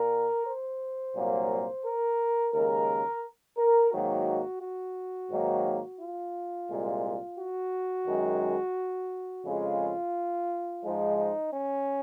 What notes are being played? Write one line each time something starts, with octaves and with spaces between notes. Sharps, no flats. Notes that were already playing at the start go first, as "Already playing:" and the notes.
Already playing: A#2 A#4
C5
C2 A#2 F#3 A#3
A#4
D#2 C#3 G#3 A#4
A#4
G#2 D#3 F#3 A#3 F#4
F#4
G#2 D#3 F#3 A#3
F4
C2 A#2 G#3
F#4
F#2 D#3 G#3
F2 C#3 G#3 F4
G#2 F3 G#3 D#4
D#4
C#4